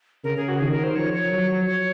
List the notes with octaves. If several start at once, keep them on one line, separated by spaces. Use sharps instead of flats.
C#3 A#4
G#4
F#4
D#3 G#4
A#4
C5
F3 C#5
C#5
F#3
C#5